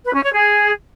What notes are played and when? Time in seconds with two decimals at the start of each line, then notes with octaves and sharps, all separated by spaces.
0.05 B4
0.14 C#4
0.24 C#5
0.33 G#4